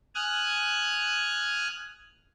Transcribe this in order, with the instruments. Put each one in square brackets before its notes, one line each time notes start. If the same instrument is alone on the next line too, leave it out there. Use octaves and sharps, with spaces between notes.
[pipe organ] G#5 D#6 F6 F#6 G#6